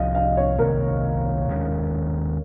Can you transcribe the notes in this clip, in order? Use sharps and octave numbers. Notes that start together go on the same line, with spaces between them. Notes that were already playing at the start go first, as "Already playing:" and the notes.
Already playing: C2 C3 F3 D#5 F5
F5
C#5
C2 C3 D#3 A#3 A#4
D#2 D#3 G#3 C#4